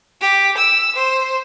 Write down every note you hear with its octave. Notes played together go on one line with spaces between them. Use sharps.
G4
E6
C5